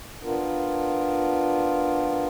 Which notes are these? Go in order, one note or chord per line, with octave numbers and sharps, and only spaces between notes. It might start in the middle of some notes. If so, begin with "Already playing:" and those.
B3 D4 F4 A#4